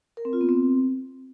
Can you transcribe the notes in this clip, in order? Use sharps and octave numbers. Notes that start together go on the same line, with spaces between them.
A#4
C4
F4
B3
C4